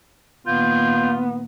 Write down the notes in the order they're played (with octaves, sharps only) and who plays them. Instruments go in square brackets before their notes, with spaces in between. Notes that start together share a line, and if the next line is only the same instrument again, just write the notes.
[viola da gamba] A#2 D#3 A#3 [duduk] B3 [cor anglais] F4 [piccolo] G6